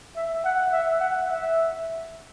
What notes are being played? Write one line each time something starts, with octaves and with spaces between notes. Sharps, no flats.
E5
F#5
E5
F#5
E5